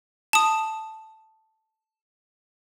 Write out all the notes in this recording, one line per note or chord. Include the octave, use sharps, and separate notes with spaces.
A5 D#6